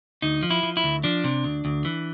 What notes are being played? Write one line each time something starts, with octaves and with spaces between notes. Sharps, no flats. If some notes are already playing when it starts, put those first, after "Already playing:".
D2 D#4
F3
E4
F3
E4
D2
F3 D4
C3
D2
D2
E3